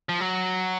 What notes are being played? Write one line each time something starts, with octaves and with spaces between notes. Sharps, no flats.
F3
F#3